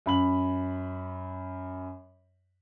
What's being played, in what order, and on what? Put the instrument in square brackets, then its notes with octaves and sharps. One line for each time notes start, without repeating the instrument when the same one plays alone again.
[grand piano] F#2 B5 F#7